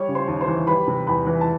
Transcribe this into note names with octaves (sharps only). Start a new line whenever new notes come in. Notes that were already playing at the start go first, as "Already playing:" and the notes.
Already playing: G3 C#5 C#6
C#3
C5 C6
D#2
C5 C6
E3
G3 B4 B5
C3
E2 B4 B5
E3
A5